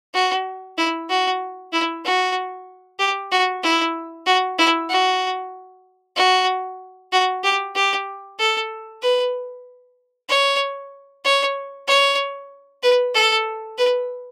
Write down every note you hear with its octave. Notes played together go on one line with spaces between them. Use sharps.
F#4
E4
F#4
E4
F#4
G4
F#4
E4
F#4
E4
F#4
F#4
F#4
G4
G4
A4
B4
C#5
C#5
C#5
B4
A4
B4